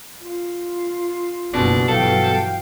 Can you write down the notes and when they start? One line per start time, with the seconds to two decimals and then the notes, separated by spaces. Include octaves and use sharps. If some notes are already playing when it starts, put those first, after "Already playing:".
0.23 F4
1.54 F#1 C2 B2 C#4 D4
1.88 G1 E3 F#3 A4 F5 G5